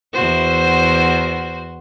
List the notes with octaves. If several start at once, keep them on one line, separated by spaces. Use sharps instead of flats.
E2 F#4 C5